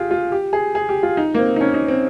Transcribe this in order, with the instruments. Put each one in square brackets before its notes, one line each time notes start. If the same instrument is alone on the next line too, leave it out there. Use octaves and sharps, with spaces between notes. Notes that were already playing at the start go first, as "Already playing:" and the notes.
Already playing: [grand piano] F4 G4 G#4
F4
G4
G#4
G#4
G4
F4
D#4
A#3
C4
D#4
C#4
D#4
C4